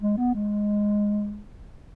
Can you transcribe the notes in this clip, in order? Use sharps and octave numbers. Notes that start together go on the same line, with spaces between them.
G#3
B3
G#3